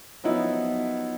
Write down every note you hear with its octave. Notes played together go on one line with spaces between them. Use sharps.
F3 F#3 B3 D#4 E4